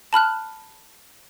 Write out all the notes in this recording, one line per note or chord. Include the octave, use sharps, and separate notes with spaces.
A5 B5 F6 F#6